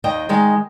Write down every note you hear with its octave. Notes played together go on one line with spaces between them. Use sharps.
D#2 D#5 G5
D#3 G#3